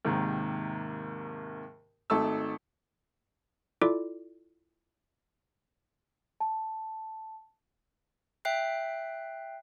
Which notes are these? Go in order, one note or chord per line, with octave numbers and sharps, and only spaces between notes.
D#2 G#2 C3 D#3
G#1 A3 D#4 A5 E6
E4 F4 A4 D5 D6
A5
E5 G5 F#6 C7